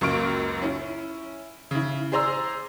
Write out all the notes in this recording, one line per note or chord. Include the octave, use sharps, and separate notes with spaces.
C#2 F#2 A#3 C#6 F6 D7
C#4 E4
C#3 E4
G#4 C5 D5 A#5 C6 E6